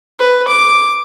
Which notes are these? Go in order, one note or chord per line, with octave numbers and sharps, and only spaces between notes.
B4
D6